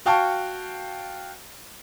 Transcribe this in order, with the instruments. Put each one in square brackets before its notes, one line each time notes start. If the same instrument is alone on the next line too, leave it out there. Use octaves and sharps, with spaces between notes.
[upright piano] F#4 F5 G5 A5 C#6